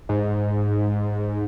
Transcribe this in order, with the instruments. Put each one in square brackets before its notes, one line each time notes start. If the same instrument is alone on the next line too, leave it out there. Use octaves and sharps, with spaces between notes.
[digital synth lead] G#2